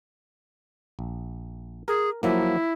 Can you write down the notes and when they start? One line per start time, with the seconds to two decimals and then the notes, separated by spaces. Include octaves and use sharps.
0.99 A#1
1.88 G#4 A#4
2.23 F3 F#3 A#3 E4